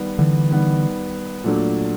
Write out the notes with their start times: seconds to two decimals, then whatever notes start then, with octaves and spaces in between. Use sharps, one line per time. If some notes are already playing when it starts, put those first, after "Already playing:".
Already playing: D#3 G3 B3
0.19 D3 E3
0.50 D#3 G3 B3
1.44 A#2 F#3 A3 D4